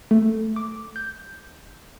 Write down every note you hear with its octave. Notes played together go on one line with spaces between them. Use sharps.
A3
D6
G6